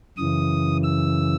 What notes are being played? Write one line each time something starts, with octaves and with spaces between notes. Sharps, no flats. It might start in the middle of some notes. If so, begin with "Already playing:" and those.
F#2 C#3 E3 D#6
E6